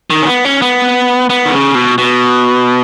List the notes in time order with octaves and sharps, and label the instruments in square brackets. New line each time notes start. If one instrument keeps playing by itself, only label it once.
[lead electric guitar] D#3
C#4
B3
C#4
B3
B3
D#3
C#3
B2
B2